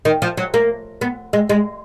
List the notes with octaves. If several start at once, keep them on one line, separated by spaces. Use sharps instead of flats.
D#3
F3
F#3
A#3
B3
G#3
G#3